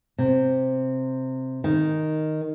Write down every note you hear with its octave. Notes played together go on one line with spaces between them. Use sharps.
C3
D#3